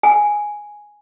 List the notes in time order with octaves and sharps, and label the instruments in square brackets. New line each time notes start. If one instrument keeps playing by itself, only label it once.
[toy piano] G#5